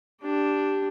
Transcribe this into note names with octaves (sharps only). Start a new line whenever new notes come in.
D4 G4